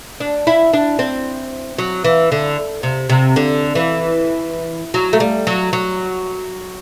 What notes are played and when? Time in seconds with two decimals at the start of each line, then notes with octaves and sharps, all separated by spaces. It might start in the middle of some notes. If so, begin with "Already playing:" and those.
0.20 D4
0.47 E4
0.73 D4
0.99 C4
1.78 F#3
2.04 E3
2.32 D3
2.83 C3
3.09 C3
3.36 D3
3.75 E3
4.94 F#3
5.13 A3
5.20 G3
5.47 F#3
5.73 F#3